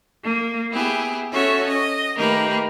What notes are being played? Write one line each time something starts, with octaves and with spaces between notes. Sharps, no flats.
A#3
B3 E4 G4 G#4
C#4 F#4 A4 C#5 E5
D#5
D#3 A3 A#3 G4 A#4 B4